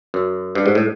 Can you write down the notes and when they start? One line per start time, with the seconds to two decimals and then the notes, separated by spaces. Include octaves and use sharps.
0.14 F#2
0.55 G2
0.66 G#2
0.75 A2